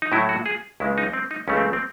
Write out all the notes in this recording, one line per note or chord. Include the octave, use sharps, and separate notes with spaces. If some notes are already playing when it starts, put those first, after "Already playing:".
D#4
A2 F#3 A3 E4
F#4
G#4
C#2 C#3 G#3 E4
D#4
C4
D#4
C#2 C#3 E3 A3 C#4
C4
C4